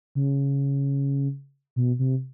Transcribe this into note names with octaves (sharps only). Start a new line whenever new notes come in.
C#3
B2
C3